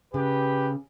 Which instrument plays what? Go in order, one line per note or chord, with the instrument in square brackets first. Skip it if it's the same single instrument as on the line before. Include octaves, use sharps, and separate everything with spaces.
[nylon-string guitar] C#3 [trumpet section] G4 B4